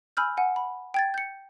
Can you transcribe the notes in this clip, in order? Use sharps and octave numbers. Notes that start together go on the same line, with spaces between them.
G#5 B5 E6 F6 G6
F#5 G#5
B5
G5 G#6 A6
G6 C#7